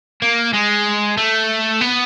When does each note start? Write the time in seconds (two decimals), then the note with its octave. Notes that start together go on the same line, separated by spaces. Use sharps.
0.22 A#3
0.54 G#3
1.17 A3
1.81 B3